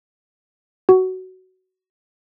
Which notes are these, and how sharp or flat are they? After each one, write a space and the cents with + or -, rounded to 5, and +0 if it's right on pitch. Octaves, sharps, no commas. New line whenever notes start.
F#4 +15